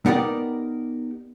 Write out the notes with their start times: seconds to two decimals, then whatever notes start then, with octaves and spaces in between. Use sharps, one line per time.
0.06 B3 D#4 G4 A#4 D5